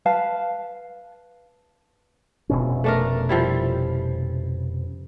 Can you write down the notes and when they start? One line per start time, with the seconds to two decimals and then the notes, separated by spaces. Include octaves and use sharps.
0.06 B4 F5 A5
2.50 F1 B2 C#4
2.84 A3 D4 A#4
3.29 F3 G3 E4